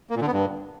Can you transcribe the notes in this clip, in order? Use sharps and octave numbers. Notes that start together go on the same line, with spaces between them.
A#3
A#2
D3
B3
G2